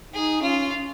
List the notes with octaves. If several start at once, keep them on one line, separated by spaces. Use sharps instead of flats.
D#4 G#4
C#4 F4